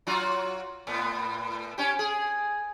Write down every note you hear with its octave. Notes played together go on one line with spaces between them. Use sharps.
F#3 F4 F#4
A2 B3
C#4 G4
G#4